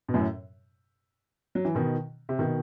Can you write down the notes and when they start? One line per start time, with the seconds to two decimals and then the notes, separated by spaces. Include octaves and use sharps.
0.09 B2
0.14 F#2 A2
1.55 F#3
1.65 E3
1.75 B2 D#3
2.29 C3
2.39 B2 D#3